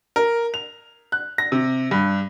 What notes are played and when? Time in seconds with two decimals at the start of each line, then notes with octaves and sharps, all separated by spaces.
0.16 A#4
0.54 F7
1.12 F#6
1.38 A#6
1.52 C3
1.91 G2